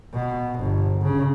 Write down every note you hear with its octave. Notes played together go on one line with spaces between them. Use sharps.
B2
G1
C#3